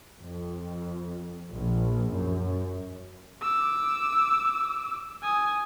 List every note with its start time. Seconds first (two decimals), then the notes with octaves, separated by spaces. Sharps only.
0.21 F2
1.52 A#1
2.12 F#2
3.41 D6 E6
5.22 G#5 D#6